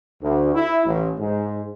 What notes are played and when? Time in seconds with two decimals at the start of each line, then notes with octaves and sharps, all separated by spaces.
0.22 D2
0.55 E4
0.86 A1
1.19 G#2